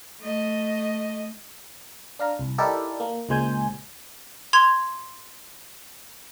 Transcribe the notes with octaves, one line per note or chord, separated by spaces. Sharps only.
A3 D#5
D4 F5 A#5
C2
D#4 E4 G4 A4 A#4 D5
A#3
C#2 A#2 G#3 C5 G#5 G6
C6 G#6 F7